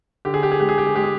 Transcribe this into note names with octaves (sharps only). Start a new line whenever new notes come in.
D3 G4
G#4
G4
G#4
G#3 G4
G#4
G4
G#4
G#3 G4
G#4